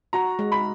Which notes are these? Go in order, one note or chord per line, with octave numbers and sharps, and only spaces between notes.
F#4 A#5
G#3
B5